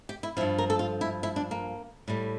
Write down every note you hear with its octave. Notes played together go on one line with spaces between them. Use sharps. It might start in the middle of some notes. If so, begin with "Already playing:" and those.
G4
E4
G2 F3 E4
A#4
A4
F4
E4
E4
D4
A#3
A2 G3